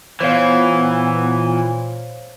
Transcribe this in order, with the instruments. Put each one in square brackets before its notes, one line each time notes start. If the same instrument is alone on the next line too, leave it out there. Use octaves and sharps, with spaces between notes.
[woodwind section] A#2 [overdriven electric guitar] E3 [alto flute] B3 [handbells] C5 C#5 F5